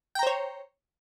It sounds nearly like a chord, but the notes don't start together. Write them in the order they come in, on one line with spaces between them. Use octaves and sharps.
G5 A#5 C5 C#5